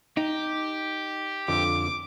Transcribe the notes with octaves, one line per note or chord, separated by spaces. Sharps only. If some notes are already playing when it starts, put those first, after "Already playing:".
D#4 G4
F2 D3 F4 D6